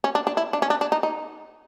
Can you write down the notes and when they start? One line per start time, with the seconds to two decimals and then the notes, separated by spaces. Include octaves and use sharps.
0.04 C#4
0.15 D4
0.27 D4
0.37 E4
0.53 D4
0.62 C#4
0.70 D4
0.81 D4
0.92 D#4
1.03 D#4